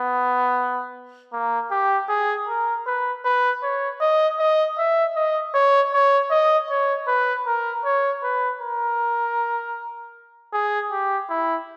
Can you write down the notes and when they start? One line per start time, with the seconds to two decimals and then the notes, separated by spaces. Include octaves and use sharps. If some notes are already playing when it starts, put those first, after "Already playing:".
Already playing: B3
1.33 A#3
1.71 G4
2.09 G#4
2.48 A#4
2.86 B4
3.25 B4
3.63 C#5
4.01 D#5
4.40 D#5
4.78 E5
5.16 D#5
5.54 C#5
5.93 C#5
6.31 D#5
6.70 C#5
7.07 B4
7.46 A#4
7.85 C#5
8.23 B4
8.61 A#4
10.53 G#4
10.91 G4
11.30 E4